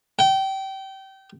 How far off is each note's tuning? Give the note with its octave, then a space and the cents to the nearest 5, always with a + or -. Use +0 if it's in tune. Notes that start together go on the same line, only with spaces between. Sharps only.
G5 -25